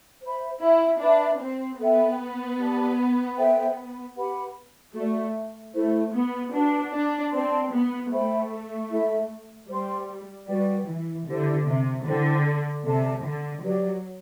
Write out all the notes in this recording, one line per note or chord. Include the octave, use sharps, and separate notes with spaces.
C5 E5 B5
E4
D4 B4 E5 B5
C4
B3 A4 E5 G5
G4 D5 A5
A4 C5 E5 G5
G4 B4 F#5 B5
A3 F#4 A4 D5
A3 E4 A4 C5
B3
D4 F#4 B4 F#5 A5
D4
C4 B4 D5 A5 C6
B3
A3 C5 E5 G5 B5
E4 A4 E5
G3 C5 G5 C6
G3 F#4 B4 D5 G5
E3
D3 E4 G4 C5
C3
D3 E4 A4 C5 G5
C3 A4 D5 A5
D3
F#3 G4 B4 D5